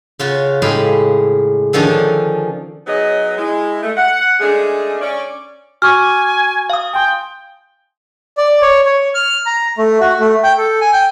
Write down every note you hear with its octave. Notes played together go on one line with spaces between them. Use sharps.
C#3 F4 F#4
A2 G#3 G4 G#4 F5 B5
D3 D#3 F3 C#4 D4
F#3 B3 D#4 G#4 C#5 D#5
G#3 E4
A3
F#5
G#3 A3 C#4 D4 G#4
C#4 D5
F#4 G#5 C#6 D6 F6
F5 D#6
G5 G#5 C6
D5
C#5
C#5
F6
A#5
A3
F#4
A3
G5
A4
G#5
G5